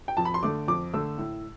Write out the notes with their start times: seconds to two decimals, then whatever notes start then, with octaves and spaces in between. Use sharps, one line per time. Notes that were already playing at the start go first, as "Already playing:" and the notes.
0.08 G5
0.17 F2 A5
0.25 B5
0.34 C6
0.43 D3 A3 D6
0.68 F2 D6
0.93 D3 A3 E6
1.18 A2